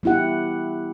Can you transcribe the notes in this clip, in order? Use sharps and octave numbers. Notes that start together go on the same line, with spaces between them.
G3 B3 E4 G4 F#5